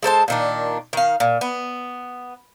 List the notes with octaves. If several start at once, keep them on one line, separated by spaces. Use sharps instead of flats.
G#3 A4 C5 A5
A#2 D#3 D4
D#3 F5
A#2
B3